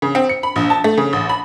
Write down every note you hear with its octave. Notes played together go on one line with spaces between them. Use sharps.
C#3
C4
C#7
B5
A#1
A5
A3
C#3
A1
B5